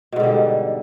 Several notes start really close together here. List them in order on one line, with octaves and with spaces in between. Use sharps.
B2 G#2 D3 G3